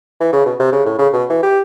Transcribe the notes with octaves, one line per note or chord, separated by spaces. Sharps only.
E3
C#3
B2
C3
C#3
A2
C#3
B2
E3
G4